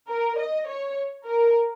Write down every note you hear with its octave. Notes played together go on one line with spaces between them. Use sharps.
A#4
D#5
C#5
A#4